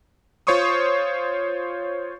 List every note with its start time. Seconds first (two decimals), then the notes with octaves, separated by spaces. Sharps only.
0.47 F4 C5 C#5 C6 C#6 D#6